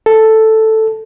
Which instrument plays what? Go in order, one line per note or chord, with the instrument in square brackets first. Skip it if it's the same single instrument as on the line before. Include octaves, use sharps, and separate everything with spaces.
[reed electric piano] A4